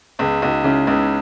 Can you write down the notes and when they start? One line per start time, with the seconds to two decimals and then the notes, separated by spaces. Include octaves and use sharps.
0.19 C#2 G#3 B3
0.42 C#2 D#4 F#4
0.64 C#3 C#4 E4
0.87 C#2 B3 D#4